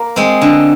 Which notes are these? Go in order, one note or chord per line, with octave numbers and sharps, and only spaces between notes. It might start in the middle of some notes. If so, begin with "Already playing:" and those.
Already playing: A#3
G#3 C4
D3